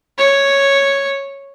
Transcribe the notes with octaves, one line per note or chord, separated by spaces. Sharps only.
C#5